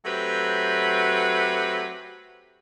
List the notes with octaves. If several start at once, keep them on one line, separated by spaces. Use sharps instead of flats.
F#3 A3 C4 G4 B4